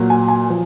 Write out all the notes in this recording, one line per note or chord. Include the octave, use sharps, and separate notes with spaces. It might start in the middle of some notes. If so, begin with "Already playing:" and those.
Already playing: A#2 F#3
G#5
G#5
F3